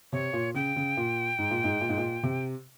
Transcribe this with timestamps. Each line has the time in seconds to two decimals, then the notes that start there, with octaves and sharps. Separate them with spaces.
0.12 C3 C#5
0.33 A#2
0.54 C#3 G5
0.76 C#3
0.97 A#2
1.38 G#2
1.51 A#2
1.64 G#2
1.81 A#2
1.89 G#2
1.97 A#2
2.23 C3